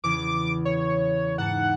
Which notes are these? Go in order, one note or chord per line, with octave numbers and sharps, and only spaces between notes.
E2 C#3 D6
C#5
G#2 F#5 A5